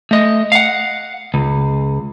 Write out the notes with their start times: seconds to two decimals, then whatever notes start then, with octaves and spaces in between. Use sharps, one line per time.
0.11 A3 D#5
0.52 F5 F#5
1.34 C#2